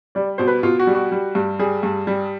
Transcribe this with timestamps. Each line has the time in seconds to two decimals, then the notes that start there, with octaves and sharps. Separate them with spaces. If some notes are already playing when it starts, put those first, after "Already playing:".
0.15 G3 D5
0.38 B2 C5
0.47 B4
0.63 B2 F4
0.79 F#4
0.87 G3
0.95 F#4
1.12 G3
1.35 G2
1.59 G3 G#4
1.83 G2
2.07 G3